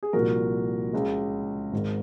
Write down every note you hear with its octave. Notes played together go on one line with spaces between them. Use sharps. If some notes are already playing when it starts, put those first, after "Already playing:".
G#4
C2 A#2 F3 F#4 A#4
C#2 C#3 G#3
G#1 G#2 D#3